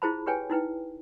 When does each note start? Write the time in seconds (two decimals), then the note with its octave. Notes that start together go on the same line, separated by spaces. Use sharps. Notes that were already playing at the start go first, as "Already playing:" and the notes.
0.02 E4 F4 G#4 C5 A5 B5
0.26 G4 G#4 B4 C#5 G5 G#5
0.50 D#4 E4 B4 G5